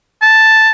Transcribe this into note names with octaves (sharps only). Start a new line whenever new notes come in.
A5